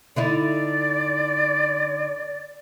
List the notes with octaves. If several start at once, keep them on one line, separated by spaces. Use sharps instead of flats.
D3 D#4 E4 D5